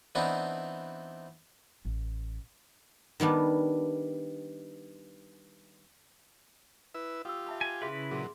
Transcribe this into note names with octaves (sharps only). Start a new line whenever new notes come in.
E3 B3 C4 D4 D#4
A1
D#3 G3 B3 D4
E4 B4 E6
F4 G4 D#6 E6
E5 A5 B5
G#5
C#3 E4 G#4 B4 E5 C6
A#2 F#3 G#4 C6